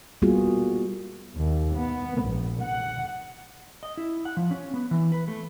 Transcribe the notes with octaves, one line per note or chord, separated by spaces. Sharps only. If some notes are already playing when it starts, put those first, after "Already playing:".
G3 A#3 B3 F4 F#4 G#4
D#2
B3
A#1
F#5
D#5
E4
F#5
F3
C#4
B3
E3
B4
A3